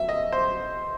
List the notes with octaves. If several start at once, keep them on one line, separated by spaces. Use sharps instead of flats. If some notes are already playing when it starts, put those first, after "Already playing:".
Already playing: E5
D#5
C5